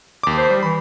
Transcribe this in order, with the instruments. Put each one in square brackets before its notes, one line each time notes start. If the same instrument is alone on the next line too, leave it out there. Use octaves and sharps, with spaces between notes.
[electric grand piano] D#2 D6
[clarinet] C5
[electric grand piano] G3
[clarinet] E3 [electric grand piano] B5